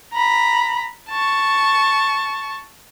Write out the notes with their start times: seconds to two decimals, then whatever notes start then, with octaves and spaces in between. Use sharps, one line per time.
0.13 A#5 B5
1.10 A5 C#6